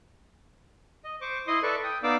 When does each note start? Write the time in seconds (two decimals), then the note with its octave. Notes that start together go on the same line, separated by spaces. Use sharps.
1.04 D#5
1.21 C5 C#6 D6
1.47 E4 D#5 C6 D#6
1.63 A4 B4 D5 E5 C#6
1.83 G5 D#6
2.03 B3 D#4 D5 F5 D6 E6